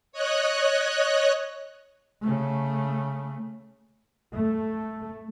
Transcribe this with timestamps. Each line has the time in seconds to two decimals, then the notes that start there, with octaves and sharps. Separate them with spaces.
0.12 C#5 D#5 F#6
2.22 C#3 A3
4.34 A3